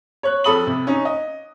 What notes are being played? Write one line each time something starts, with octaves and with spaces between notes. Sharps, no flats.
C#5 F#6
F2 A4 B5 D#6 F#7
C3
C#4 D#4
D#5